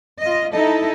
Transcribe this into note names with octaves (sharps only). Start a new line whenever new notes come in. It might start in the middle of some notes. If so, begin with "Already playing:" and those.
F4 D#5
D#4 E4 A4 D#5